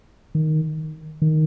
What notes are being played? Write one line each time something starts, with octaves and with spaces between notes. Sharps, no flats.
D#3
D#3